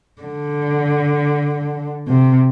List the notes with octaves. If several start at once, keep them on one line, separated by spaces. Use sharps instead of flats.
D3
C3